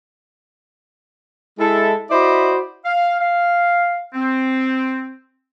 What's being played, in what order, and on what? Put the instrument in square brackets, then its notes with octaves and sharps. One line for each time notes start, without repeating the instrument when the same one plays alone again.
[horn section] G#3 E4 A4
E4 F#4 C5 D5 D#5 B5
[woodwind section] F5
F5
C4